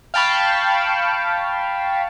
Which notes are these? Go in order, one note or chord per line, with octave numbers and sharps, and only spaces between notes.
F5 G5 A5 B5 C#6